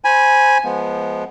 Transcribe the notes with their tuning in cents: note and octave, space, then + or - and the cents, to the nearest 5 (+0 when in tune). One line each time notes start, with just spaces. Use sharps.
C5 +0 G#5 +0 B5 -20
F3 +0 G#3 +15 B3 -10